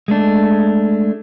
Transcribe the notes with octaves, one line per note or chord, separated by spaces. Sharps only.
G#3 A3 D4